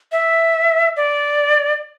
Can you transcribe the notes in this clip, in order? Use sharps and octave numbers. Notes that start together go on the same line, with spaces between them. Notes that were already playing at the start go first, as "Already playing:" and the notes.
E5
D5